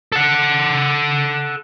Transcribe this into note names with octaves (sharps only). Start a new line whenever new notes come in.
A4 F#5